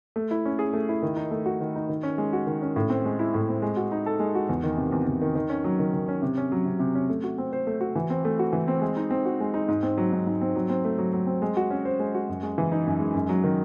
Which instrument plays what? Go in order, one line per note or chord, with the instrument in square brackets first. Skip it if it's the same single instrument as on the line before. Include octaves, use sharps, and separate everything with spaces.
[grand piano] A3
E4
C#4
G#4
A3
E4
D#3
D#4
A3
F#4
D#3
D#4
D#3
C#4
G#3
F#4
D#3
C#4
A2
C4
G#3
E4
A2
C4
G#3
F#4
D#4
A4
G#3
F#4
E2
D#3
C3
E2
E2
D#3
D#3
C#4
F#3
D#3
D#3
C#4
C3
C#4
F#3
C3
C3
C#4
A3
F#4
C4
C5
A3
F#4
E3
C4
A3
F#4
E3
C4
G#3
D#4
C4
F#4
G#3
D#4
G#2
C4
F#3
G#2
G#2
C4
F#3
C4
A3
F#3
F#3
C4
G#3
F#4
C#4
C5
G#3
F#4
F#2
G#3
E3
D#4
F#2
G#3
F#2
F#3
D#3